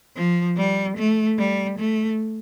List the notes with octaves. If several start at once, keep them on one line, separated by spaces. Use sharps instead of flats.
F3
G3
A3
G3
A3